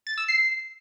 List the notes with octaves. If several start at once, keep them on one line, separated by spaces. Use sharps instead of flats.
A6
E6
C7